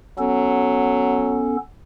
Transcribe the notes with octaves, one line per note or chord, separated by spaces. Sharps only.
F#3 B3 C#4 A4